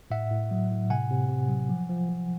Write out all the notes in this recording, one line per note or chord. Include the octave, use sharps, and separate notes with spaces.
A2 E5 F#5
A2
F#3
A2
C3 F#5 G#5
C3
C3
F#3
F3
F3
F3